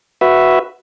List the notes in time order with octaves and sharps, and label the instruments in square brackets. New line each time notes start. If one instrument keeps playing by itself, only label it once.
[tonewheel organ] F#4 B4 E5